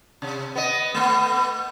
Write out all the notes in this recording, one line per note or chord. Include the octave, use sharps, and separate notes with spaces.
C3
B3 D#5
A3 B3